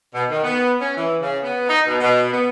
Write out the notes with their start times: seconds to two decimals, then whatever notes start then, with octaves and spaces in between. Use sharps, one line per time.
0.15 B2
0.30 D#3
0.44 B3
0.80 C#4
0.97 E3
1.21 C#3
1.43 B3
1.69 D#4
1.87 B2
2.00 B2
2.33 B3